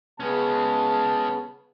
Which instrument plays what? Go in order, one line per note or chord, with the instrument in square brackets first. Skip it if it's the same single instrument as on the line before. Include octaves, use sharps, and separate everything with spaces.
[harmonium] C#3 B3 [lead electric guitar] G#3 C#4 [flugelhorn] A5